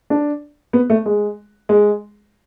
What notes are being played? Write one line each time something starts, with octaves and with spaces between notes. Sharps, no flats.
D4
B3
A3
G#3
G#3